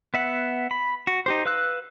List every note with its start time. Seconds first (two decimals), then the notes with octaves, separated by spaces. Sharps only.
0.14 B3 E5 F#5
0.71 B5
1.07 F#4
1.26 D#4 G4 C5
1.45 B4 F5 E6 F#6